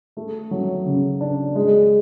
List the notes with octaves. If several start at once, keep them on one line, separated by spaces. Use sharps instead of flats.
A3
F#3
C#3
D4
G#3